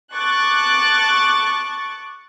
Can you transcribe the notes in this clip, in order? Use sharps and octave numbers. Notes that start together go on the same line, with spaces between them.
A5 C#6 D6 F#6 A6